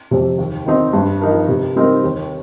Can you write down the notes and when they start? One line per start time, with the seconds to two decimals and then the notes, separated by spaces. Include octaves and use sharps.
0.11 F2 C3
0.38 D#2
0.66 D#3 C4 D#4
0.93 G2
1.21 F3 D#4 A#4
1.49 C3
1.76 G3 C4 D#4 A#4
2.04 D#2